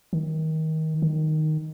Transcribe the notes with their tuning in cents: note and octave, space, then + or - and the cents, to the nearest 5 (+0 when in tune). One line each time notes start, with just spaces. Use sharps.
D#3 +25
D#3 -5